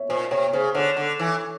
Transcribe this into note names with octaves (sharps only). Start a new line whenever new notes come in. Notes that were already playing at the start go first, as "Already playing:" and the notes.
Already playing: C#5 E5
A#2 C5
C3 C#5
C#3 C5
D3 C#5
D3
E3